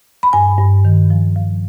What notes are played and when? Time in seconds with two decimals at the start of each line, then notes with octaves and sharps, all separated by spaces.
0.23 B5
0.33 G2 G#5
0.58 G2
0.85 D#3
1.10 F3
1.36 F3